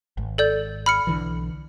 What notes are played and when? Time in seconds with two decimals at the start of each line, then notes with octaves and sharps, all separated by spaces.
0.17 G#1
0.38 A4 D5 G6
0.86 B5 F6 C#7
1.07 B1 D3 E3